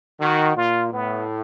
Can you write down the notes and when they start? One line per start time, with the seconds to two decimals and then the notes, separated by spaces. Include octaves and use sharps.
0.20 D#3 F#4
0.56 A#2 F4
0.92 A2 B3